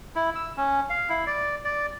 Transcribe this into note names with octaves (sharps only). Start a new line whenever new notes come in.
E4
E6
C#4
F5
E4
D5
D5